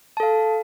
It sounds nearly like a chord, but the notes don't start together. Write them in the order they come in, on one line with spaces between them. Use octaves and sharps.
A5 A4 F5